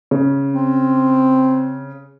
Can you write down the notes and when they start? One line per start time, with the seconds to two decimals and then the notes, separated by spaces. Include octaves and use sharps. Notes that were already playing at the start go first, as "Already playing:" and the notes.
0.11 C#3
0.53 C4